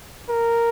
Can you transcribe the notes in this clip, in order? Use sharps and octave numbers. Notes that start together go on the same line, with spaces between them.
A#4